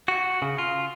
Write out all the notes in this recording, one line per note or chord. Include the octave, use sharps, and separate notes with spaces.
F#4
C#3
F4